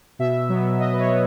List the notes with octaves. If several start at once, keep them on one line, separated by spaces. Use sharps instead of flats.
B2 E5
F#3 B3
B2 D#5
B4
C#5
F#3 B3